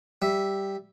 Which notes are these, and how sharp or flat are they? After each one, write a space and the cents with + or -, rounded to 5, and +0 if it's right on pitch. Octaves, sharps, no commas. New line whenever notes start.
G3 +0 E5 +0